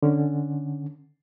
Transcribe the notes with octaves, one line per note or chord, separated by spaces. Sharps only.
D3 C#4